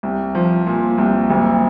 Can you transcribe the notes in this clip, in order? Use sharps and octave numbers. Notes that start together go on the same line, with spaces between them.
C2
F3
A#2
C2
F#1